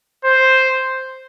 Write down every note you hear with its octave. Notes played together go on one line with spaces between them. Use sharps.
C5